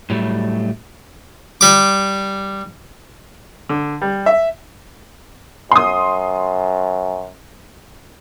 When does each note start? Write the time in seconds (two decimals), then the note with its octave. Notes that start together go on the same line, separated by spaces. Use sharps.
0.10 A2 F#3 G3 A3
1.61 G3 D6
3.69 D3
4.02 G3
4.26 E5
5.71 F#2 C6 D#6